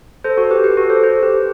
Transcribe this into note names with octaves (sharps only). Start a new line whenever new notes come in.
A4 C5
F#4 A4
G4 B4
G4 B4
F#4 A4
A4 C5
A4 C5
G4 B4